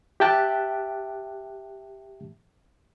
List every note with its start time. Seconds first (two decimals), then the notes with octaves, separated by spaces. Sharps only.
0.20 G4 E5 G5 A5 F#6